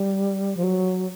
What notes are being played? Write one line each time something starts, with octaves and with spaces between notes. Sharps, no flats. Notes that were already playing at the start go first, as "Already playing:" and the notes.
Already playing: G3
F3
F#3